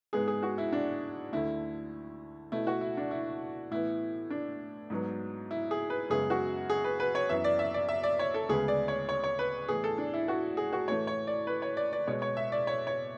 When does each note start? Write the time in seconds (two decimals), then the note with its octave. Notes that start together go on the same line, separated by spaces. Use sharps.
0.13 G#2 G#3 B3 G#4
0.28 G#4
0.43 F#4
0.58 E4
0.73 D4
1.33 D2 D3 A3 E4
2.52 B2 A3 E4
2.67 F#4
2.81 E4
2.97 D4
3.11 E4
3.71 A2 E3 B3 E4
4.30 D4
4.90 G#2 F#3 B3
5.51 E4
5.71 G#4
5.90 B4
6.10 F#2 C#3 G#3 B3 G#4
6.30 F#4
6.70 G#4
6.84 B4
7.00 B4
7.15 C#5
7.29 F#2 E3 B3 E5
7.44 D5
7.59 E5
7.74 D5
7.89 E5
8.03 D5
8.19 C#5
8.34 A4
8.49 D2 C#3 G#3 B3 G#4
8.68 D5
8.88 C#5
9.09 C#5
9.24 C#5
9.39 B4
9.68 A2 E3 B3 G#4
9.84 A4
9.98 D4
10.14 E4
10.28 F#4
10.57 G#4
10.73 F#4
10.88 A2 E3 A3 C#5
11.07 C#5
11.27 D5
11.47 B4
11.62 C#5
11.77 D5
11.93 D5
12.07 B2 G#3 B3 C#5
12.22 C#5
12.37 E5
12.52 D5
12.67 C#5
12.87 C#5